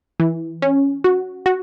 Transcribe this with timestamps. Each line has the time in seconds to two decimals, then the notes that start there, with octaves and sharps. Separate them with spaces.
0.20 E3
0.62 C#4
1.04 F#4
1.46 F#4